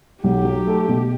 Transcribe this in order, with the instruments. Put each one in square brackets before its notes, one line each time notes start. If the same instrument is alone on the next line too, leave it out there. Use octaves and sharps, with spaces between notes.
[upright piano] B1 [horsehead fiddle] G4
[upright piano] F#3
A3
B2